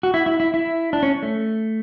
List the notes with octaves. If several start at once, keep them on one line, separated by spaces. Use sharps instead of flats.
F#4
E4
E4
E4
E4
D4
C#4
A3